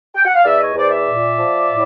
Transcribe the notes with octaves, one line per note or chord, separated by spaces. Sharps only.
G5
F#5
F5
E2 D5 E5
C#5 D#5
E2 C5 D5
D5 E5
A#2
F3
A2